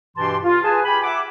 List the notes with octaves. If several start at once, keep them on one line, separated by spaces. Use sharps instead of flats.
G2 B2 E3 G4 A5 C6
F4
G#4 B4 G#5 A5
G4 G#5 B5
E5 F#5 D6